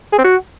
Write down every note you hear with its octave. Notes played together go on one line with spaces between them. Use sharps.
G#4
C4
F#4